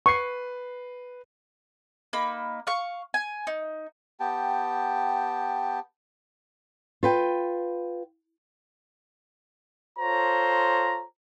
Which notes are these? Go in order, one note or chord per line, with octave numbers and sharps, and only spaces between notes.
B4 C#6 C7
A#3 D#4 B5
F5 C#6
G#5
D#4
B3 G4 G5 A5
F4 B4 G5
F4 A4 C5 C#5 A#5